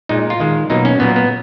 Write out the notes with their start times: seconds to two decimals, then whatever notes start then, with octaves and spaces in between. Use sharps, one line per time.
0.09 A#2 G#3 D#4
0.30 F4
0.40 D#3 G#3
0.70 B2 F#3 A#3 D#4
0.85 C#4
1.00 A#2 F#3 A#3 B3
1.16 B3